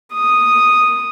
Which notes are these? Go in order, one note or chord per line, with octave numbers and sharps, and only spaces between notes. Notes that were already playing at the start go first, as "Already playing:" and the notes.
D#6